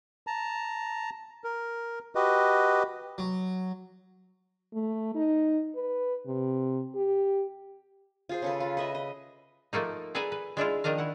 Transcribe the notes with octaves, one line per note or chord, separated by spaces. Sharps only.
A5 A#5
A#4
F#4 G4 B4 D#5
F#3
A3
D#4
B4
C3
G4
F4 G#4 C5
C#3 A4 B4
F4
B4 D#5 E5
D#5
F3 A3 A#3 D#4
G#4 A4 B4 D5 G#5 A#5
B4
G#3 D4 E4 F4
D#3 F3 D4 D#5 F5
E4 F#5